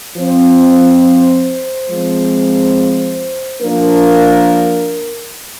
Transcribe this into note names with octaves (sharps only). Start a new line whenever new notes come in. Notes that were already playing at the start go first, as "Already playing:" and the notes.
F3 C4 C5
F3 G#3 C4
F3 A#3 D4 A#4